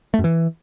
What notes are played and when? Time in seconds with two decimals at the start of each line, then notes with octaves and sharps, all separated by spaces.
0.14 A3
0.19 F#2
0.24 E3